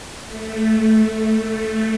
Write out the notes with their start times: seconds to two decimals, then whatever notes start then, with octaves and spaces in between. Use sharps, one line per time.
0.23 A3